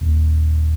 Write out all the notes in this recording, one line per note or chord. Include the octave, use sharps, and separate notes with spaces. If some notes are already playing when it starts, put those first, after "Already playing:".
D#1